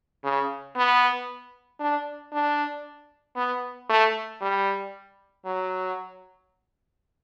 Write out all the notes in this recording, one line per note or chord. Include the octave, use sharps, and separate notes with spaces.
C#3
B3
D4
D4
B3
A3
G3
F#3